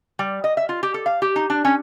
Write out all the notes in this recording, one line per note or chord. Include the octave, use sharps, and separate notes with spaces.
G3
D#5
E5
F4
G4
A4
F5
G4
D#4
D4
C#4